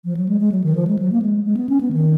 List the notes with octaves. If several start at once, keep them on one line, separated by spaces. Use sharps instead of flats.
F3
F#3
G#3
G#3
F#3
D#3
F3
G#3
F#3
A#3
G#3
G#3
B3
C#4
B3
D#3